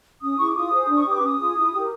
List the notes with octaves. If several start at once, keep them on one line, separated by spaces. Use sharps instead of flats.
C#4 D#6
E4 G#4 C#6
D6
F4 D#6
G#4 C5
D4
C#6
G4 B4 D6
C#4 D#6
F4 G#4
E4
G4 A#4